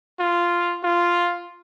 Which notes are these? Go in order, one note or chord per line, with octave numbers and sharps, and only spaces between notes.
F4
F4